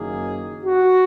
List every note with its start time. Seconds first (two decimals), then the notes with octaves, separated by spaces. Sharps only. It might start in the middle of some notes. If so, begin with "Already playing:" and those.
Already playing: F#1 F#2 D#3 A#3 G#4
0.65 F#4